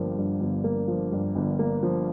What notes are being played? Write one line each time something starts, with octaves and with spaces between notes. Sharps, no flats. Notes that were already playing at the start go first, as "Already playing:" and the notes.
Already playing: G1 G2 F3 A#3
G2
G1
A#3
F3
G2
G1
A#3
F3